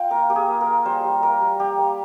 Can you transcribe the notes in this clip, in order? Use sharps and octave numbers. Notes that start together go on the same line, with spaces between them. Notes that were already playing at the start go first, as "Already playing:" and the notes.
Already playing: F4 F5 G5
A#3 A#4
A#3 G4
G#4
A#3
A#4
A#3
G3 C5
G3
A#3 A#4
G3
G3 G4
A#3